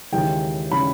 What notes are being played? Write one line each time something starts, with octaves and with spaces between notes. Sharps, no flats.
D#2 C#3 E3 G#3 C#4 G5
C#3 E3 G#3 C#4 B5